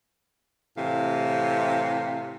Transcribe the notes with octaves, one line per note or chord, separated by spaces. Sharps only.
A2 C3 E3 F5